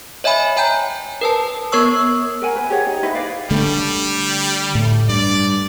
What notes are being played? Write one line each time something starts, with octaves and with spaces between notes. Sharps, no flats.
C#5 D#5 E5 G#5 B5
C#5 G5 G#5 A#5 G6
A#4 B4 A5
B3 A#4 C#5 C#6 E6
A#4 F#5 G#5 A#5
B4
G4 G#4 C#5 F#5
D#4
D#4 E4 B4 D#5
B4 D5 F5
D3 G3 A3
A2
G2 D5